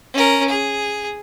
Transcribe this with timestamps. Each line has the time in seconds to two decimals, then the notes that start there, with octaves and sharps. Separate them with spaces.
0.13 C#4 A#4
0.49 G#4